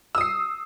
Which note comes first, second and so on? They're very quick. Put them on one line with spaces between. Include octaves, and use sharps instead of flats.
E6 D#6 C7